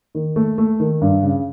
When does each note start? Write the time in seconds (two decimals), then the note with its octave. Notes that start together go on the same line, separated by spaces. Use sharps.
0.15 D#3
0.36 A3
0.58 A3
0.80 D#3
1.01 G2
1.23 C#3